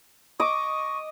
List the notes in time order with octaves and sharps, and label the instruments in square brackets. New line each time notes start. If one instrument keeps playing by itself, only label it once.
[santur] D#5 D6 [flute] C#6